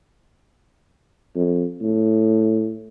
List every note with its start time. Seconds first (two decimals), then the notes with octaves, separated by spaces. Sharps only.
1.36 F2
1.81 A2